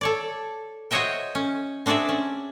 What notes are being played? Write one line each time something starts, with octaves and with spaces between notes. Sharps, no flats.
A4 C#5 D5
F#4 C5 C#5 D#5 E5 G5
C#4
C4 D4 F#4 G#4 D5 E5
C#4